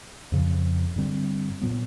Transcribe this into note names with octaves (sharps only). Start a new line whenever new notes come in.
F2 C#3 F3
G2 D3 G3 C4
A#2 F#3 B3